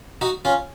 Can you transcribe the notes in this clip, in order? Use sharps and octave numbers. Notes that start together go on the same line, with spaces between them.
D#4 F#4
C#4 F4